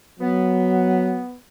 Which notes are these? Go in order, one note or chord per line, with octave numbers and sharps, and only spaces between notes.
F#3 B3